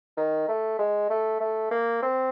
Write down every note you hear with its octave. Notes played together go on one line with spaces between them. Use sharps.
D#3
A3
G#3
A3
A3
A#3
C4